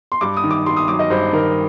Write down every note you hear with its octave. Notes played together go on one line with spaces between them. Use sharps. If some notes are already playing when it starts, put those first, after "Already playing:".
C6
G2 D6
D#6
D#3
D6
G2 C6
D#6
F#3 D6
D#5
G2 C5
D#3 A#4